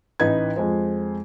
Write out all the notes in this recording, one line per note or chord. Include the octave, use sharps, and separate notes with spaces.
A1 E3 D#4 B4 G#6
F2 G#3 C5